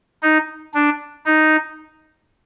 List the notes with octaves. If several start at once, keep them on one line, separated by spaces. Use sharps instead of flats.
D#4
D4
D#4